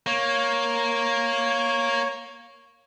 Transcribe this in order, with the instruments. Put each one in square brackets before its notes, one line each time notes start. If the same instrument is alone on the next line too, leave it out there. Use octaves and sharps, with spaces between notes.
[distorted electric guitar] A#3 [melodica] C#5